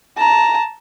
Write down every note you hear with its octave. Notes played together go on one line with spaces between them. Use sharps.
A5 A#5